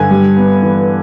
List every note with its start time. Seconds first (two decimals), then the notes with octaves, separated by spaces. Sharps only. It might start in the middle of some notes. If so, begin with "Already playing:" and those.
Already playing: G2 D3 G#5
0.11 G3
0.36 B3
0.63 E3